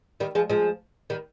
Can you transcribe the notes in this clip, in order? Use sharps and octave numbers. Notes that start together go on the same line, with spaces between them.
D#3 G3
F3 G#3
F3 G#3
D#3 G3